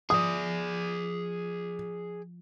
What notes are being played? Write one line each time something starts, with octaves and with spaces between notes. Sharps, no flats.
F3 G#4 D5 D#6